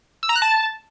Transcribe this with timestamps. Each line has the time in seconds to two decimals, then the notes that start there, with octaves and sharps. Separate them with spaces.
0.23 E6
0.29 A#5
0.36 F#6
0.42 A5